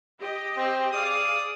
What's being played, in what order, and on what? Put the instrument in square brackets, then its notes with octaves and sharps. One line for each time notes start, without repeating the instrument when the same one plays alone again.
[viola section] G4 D#5
[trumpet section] C4
[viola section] G#4 F5 [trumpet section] D5 D6 D#6